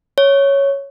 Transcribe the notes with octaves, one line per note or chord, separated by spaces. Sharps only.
C#5